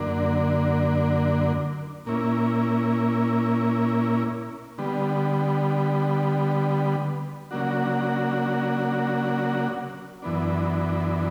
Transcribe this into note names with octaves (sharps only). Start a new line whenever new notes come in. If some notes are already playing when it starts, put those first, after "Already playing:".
Already playing: F#2 D3 A#3 D4
A#2 A#3 C#4 E4
D3 G3 B3
C#3 F#3 A#3 D4 F#4
F#2 E3 B3 D4